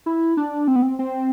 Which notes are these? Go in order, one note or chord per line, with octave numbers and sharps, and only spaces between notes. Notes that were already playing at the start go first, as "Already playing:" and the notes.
E4
D4
C4
B3
C4
C4